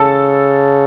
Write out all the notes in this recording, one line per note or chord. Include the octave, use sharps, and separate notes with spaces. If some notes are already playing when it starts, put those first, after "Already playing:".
Already playing: C#3 A4